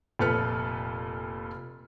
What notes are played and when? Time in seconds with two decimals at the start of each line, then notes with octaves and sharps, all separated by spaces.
0.19 F1 A#2 A4 B4 F6 C#7